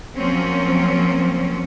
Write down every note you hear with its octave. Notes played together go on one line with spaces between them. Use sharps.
F3 F#3 A#3 C4 C#4